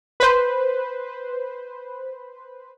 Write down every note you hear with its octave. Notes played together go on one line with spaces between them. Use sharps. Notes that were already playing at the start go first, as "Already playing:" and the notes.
B4 C5